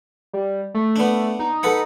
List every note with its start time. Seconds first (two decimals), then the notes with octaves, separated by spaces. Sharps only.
0.33 G3
0.74 A3
0.96 B3 D4
1.39 D#4
1.63 A4 B4 F#5